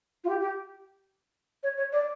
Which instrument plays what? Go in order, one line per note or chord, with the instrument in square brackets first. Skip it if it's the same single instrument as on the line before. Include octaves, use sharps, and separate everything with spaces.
[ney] F4
G4
G4
C#5
C#5
D5